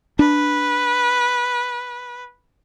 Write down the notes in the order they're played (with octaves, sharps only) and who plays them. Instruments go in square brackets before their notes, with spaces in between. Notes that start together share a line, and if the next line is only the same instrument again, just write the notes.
[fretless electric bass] D4 [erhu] B4